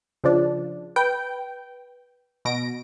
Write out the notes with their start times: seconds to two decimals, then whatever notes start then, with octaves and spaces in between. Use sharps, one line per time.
0.24 C#3 F3 D4
0.96 B4 G5
2.45 B2 A#6 D7